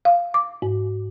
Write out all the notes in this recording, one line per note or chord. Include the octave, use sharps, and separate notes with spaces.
F5
D6
G#2